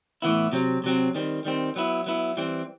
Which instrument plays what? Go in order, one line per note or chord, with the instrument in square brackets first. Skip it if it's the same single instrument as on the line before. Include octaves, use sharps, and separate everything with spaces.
[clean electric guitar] A2 E3 B3 E4
C3 F#3 C4
C3 F#3 C4
D#3 G3 C4
D#3 G3 C4
F#3 B3 E4
F#3 B3 E4
E3 G3 C4